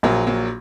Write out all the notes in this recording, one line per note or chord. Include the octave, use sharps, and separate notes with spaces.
A#1 F#3 A#3
F#3 A#3